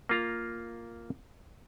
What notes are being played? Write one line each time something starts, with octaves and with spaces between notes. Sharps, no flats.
A#3 F4 A#5